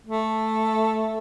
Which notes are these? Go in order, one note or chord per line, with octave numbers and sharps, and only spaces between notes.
A3